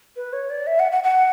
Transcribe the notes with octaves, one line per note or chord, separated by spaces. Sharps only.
B4
C#5
D5
E5
F#5
F#5
F#5